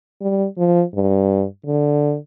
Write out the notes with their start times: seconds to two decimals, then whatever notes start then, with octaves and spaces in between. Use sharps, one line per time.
0.21 G3
0.58 F3
0.94 G2
1.66 D3